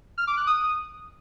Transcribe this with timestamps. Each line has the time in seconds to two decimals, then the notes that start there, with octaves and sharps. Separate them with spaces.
0.18 F6
0.27 D6
0.37 F#6
0.47 D#6